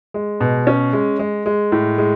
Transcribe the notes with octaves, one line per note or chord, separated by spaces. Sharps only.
G#3
B2
C#4
G#3
G#3
G#3
A2
G#3